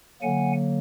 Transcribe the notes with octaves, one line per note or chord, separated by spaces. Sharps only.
D3 F#3 A#3 F#5 G#5